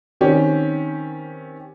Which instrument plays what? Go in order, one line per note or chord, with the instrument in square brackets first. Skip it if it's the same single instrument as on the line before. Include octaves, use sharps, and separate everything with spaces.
[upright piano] D#3 C4 C#4 G4